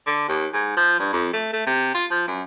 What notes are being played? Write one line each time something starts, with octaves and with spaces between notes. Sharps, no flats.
D3
D#2
G#2
F3
G2
F2
A3
A3
C3
F4
F3
F#2